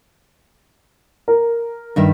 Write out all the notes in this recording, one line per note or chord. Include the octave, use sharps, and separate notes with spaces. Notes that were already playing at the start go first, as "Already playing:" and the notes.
A#4
G2 D#3 E5